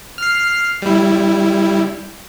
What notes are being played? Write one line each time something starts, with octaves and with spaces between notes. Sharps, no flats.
F6 C7
G3 E4